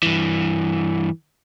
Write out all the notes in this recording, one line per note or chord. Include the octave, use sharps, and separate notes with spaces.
G2 E3